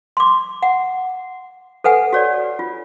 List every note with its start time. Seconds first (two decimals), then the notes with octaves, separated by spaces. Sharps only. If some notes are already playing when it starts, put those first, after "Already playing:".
0.17 C6 D6
0.63 F#5
1.84 A4 B4 F#5 G#5
2.13 F#4 C#5 D5
2.59 F4